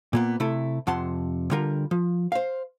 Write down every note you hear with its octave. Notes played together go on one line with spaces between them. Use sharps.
A#2 A#3 B3
C3 A3 E4 A4
F2 C3 F#5 A5 C6
D3 G3 F4 A#4
F3
C5 F5